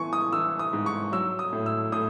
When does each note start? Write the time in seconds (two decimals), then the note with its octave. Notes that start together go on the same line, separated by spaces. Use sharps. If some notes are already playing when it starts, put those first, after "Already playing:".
Already playing: E3 B3 G#5 C#6
0.13 D#6
0.33 E3 E6
0.59 D#6
0.73 G#2
0.86 C#6
1.12 F#3 E6
1.39 D#6
1.53 A2
1.66 E6
1.92 A2 D#6